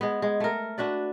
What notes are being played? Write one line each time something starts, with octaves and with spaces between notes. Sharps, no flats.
G#3 B3
G#3
A3 A#4
D4 F#4 B4 D5